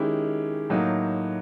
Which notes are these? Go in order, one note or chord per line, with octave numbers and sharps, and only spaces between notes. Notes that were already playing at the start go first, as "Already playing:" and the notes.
Already playing: D#3 G#3 C#4 E4 G4
A2 F#3 A#3 D#4